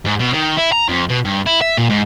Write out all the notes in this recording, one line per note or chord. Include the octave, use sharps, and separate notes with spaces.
G#2
B2
D#3
E4
A#5
F2
B2
G2
E4
E5
A#2
G#2